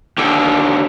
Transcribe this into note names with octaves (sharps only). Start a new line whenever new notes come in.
D#2 D3